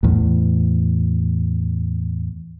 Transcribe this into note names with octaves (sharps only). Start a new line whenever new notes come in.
E2 A2